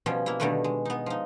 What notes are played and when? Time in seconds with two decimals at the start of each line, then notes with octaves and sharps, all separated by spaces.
0.06 B2 F3 G3 C#4
0.26 A#3 E4
0.40 B2 D3 D#3 G3 A3 B4
0.64 G#3
0.85 B3 D#4
1.06 F3 D#4